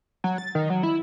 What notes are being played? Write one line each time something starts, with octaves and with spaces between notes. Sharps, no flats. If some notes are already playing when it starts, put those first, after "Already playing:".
F#3
A6
D#3
F#3
E4